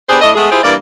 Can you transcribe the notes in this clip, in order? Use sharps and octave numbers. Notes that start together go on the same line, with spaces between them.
B3 D4 G4 G#4 B4 C5
A2 A3 D4 D#5
G#3 A3 B3 G#4
E4 F4 G4 G#4 C5
G2 E3 A#3 D5